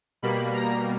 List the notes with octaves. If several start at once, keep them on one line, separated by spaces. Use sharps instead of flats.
B2 G3 A#3 B5
A#5